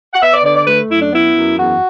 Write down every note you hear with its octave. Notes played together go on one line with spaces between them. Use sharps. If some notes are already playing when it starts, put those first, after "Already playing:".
F#5
B3 E5
D5
D3 D5
D5
A3 B4
F#2 E4
D4
B3 E4
F#2
E2 F#4